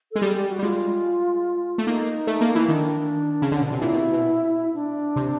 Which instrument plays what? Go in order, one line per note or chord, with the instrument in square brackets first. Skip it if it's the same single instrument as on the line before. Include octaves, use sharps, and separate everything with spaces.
[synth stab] G#3 [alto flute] A4
[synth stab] G3 [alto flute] G#4
[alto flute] G4
F#4
[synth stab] G3
[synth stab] G#3 [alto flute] F4
[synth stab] A3
[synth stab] A#3 [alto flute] D#4
[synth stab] A3
A#3
E3
[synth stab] D#3 [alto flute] D4
[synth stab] C#3
[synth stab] D3 [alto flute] C#4
[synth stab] B2 [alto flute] D4
[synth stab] C3
[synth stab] A#2 [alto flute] E4
[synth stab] B2
B2
[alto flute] D4
[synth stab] C3